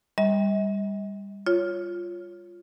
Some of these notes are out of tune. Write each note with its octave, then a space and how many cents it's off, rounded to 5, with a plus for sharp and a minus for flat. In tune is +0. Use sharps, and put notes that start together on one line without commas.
G3 +25 D#5 +45
F4 +0 C#5 +0